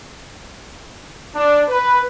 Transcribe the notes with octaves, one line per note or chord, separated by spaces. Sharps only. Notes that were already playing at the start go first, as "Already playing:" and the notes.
D4
B4